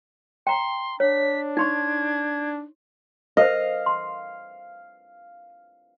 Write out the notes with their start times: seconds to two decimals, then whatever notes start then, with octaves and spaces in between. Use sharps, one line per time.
0.47 G5 A#5 C6
1.00 D4 C#5 B6
1.57 D#4 C6 C#6 G#6
3.37 A#4 C5 D#5 F5
3.86 C6